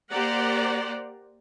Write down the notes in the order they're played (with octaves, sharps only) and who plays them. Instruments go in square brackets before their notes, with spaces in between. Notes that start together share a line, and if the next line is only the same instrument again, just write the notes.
[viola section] A#3 G4 C5 D5 F#5 A#5